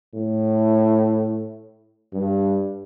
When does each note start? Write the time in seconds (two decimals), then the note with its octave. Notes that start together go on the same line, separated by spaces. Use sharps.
0.14 A2
2.13 G2